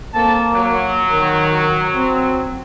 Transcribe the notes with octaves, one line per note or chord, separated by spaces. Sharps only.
A#3 C4 A4 A5
F#3
D#3
C4